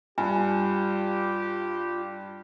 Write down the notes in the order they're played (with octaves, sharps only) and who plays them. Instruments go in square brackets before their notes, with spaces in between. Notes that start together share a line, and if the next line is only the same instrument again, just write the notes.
[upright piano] G2 [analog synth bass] F4 [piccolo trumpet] G4 [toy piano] G#5